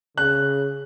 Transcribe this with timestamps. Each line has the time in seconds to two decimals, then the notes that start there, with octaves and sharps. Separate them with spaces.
0.18 C#3 F#6